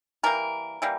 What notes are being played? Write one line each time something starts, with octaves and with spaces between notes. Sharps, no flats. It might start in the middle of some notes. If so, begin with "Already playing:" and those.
E3 G3 A#3 A#4
E3 G3 A#3